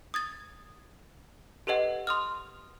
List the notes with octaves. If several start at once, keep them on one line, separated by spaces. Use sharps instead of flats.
D#6 G#6 A6
G4 A4 B4 D#5 F#5
C6 D#6 F6